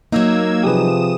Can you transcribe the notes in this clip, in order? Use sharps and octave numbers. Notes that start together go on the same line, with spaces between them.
F#3 A#3 D#4 E6 G#6
C3 F3 G4 G#4 B4 D#6 E7